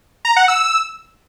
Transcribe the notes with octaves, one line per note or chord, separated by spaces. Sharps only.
A#5
F#5
E6